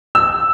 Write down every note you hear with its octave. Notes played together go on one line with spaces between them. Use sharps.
E6